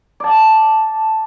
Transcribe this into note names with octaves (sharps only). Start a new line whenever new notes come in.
D5 A5